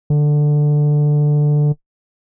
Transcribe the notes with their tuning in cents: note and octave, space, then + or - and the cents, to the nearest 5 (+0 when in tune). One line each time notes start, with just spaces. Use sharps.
D3 +10